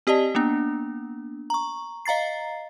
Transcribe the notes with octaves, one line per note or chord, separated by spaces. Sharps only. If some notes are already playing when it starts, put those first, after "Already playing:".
C4 G4 D5 D#5 A5
A#3 B3 D4
A#5 C#6
D#5 F5 A#5 A6 C7